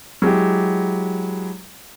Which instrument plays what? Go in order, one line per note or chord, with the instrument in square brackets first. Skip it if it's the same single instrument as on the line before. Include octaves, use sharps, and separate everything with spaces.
[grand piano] F#3 G#3 E4 G4